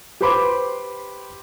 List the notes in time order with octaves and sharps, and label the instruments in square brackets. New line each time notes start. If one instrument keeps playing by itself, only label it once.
[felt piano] G4 B4 C5 B5 C6 D6